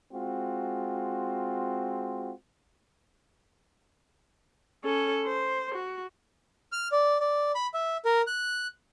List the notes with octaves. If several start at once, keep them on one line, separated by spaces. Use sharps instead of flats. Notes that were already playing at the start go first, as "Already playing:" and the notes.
G#3 C4 F4 F#4
C#4 A4
C5
F#4
F6
D5
D5
B5
E5
A#4
F#6